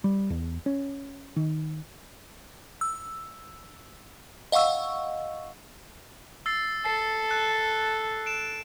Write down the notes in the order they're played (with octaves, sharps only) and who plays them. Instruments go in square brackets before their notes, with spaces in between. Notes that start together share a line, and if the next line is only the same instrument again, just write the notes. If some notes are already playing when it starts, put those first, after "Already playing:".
[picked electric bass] G3
E2
C#4
D#3
[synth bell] E6
D#5 F5 F#5 C#6 E6
[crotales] E6 A6 C7
[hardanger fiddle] A4 [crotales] C7
[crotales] F#6
D7 E7